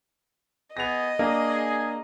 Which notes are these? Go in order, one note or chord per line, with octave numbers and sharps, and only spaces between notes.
B3 G#4 D#5 A#6 F7
A#3 D4 G#4